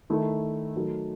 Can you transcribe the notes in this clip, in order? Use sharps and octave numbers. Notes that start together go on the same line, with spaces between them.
D#3 A3 E4
D#3 F#3 A3